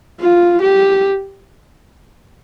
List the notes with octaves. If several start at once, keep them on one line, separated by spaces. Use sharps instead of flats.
F4
G4